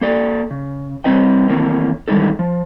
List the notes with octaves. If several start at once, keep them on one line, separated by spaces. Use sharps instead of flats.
A#3 A4 D5
C#3
G3 C4 B4 D#5 G5
D#3 E3 A3 A#3 C4
D#3 E3 G3 G#3 D#4 A4
F3